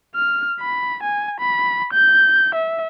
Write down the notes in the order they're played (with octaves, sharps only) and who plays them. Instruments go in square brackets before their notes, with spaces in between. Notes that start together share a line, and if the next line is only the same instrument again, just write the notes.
[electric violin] F6
B5
G#5
B5
G6
E5